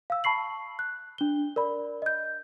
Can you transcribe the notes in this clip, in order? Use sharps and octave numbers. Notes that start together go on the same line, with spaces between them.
F5 E6
A5 B5 C#6 C7 F#7
F#6
D4 G7
A#4 D5 B5
D#5 G6